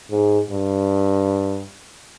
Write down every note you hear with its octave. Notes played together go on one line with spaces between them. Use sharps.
G#2
G2